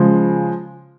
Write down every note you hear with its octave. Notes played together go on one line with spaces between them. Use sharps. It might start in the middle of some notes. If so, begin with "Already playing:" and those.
Already playing: C#3 F3 G#3